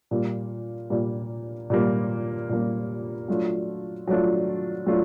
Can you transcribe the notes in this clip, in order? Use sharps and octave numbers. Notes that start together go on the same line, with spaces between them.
A#2 G3 A#3
A#2 G3 A#3
A#2 G3 A#3
A#2 G3 A#3
F#3 A3 D4 F4
F#3 A3 D4 F4
F#3 A3 D4 F4